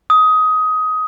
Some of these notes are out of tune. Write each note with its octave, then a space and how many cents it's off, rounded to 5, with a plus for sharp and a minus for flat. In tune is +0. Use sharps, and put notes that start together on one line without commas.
D#6 +15